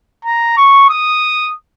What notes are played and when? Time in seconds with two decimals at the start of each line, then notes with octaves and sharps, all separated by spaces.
0.25 A#5
0.57 C#6
0.89 D#6